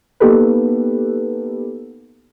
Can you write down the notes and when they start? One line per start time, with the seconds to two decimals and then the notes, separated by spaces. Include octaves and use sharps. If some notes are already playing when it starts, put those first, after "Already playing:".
0.20 A#3 B3 D#4 G4 A4 B4